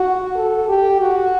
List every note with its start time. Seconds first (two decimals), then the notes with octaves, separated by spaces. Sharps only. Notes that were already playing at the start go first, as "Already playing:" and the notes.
Already playing: F#4
0.36 A4
0.68 G4
1.01 F#4